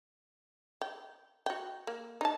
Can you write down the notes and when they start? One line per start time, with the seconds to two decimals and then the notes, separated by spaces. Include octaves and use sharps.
0.81 G5
1.46 F#4 G5
1.87 A#3
2.21 D#4 A5